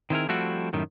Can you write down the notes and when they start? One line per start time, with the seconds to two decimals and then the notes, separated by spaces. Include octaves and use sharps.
0.10 D#3 C4 E4 G#4 A#4
0.29 F3 G3 A3 C4 E4 F#4
0.73 F#2 A2 D#3 G3